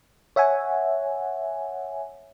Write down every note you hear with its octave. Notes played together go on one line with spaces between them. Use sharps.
C#5 E5 F#5 G#5